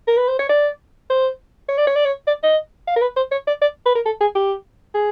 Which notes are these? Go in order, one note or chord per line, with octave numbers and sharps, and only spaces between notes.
A#4
B4
C5
C#5
D5
C5
C#5
D5
C#5
D5
C#5
D5
D#5
F5
A#4
B4
C5
C#5
D5
D5
B4
A#4
A4
G#4
G4
G#4